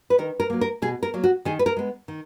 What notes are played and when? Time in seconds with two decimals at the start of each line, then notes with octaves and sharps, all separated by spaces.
0.10 B4
0.18 D#3 A#4
0.40 A#4
0.50 F#3 A#3
0.61 A#4
0.82 B2 G#4
1.03 A#4
1.14 F#3 A#3
1.24 F#4
1.45 D#3 G#4
1.59 B4
1.66 A#4
1.76 G#3 B3
2.08 D#3